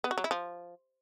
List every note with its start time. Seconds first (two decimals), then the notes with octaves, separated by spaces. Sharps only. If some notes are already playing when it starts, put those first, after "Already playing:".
0.04 B3
0.11 F#4
0.18 F#3
0.24 E4
0.31 F3